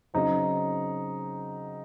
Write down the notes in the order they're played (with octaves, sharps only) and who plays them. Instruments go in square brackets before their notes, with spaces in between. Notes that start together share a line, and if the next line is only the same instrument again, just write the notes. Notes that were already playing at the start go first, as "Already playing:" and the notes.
[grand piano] C#3 F#3 C4 D#4